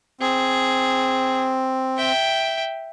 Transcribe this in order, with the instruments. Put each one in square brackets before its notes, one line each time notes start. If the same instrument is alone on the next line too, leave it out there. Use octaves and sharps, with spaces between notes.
[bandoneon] C4 [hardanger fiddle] G#4
[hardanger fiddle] E5 G5